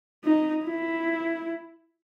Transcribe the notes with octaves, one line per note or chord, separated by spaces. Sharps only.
D#4
E4